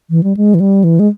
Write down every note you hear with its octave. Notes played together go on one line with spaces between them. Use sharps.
E3
G3
G#3
E3
G3
E3
G#3